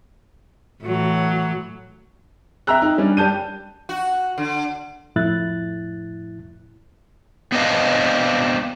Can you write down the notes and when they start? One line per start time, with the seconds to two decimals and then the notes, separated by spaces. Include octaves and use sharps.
0.83 A2 E3 F#3
2.67 E5 G5 A#5 E6 F#6
2.82 D#4
2.98 G3 C#4 D4
3.17 G3 G4 A5 G6 D#7
3.89 F#4
4.38 D3
5.16 F2 A2 E4 F#6 A6
7.52 B3 C4 D4 B4 D#5 F5